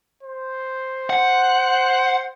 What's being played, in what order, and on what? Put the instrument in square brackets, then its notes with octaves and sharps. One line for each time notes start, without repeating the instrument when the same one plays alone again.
[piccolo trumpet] C5
[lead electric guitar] F#5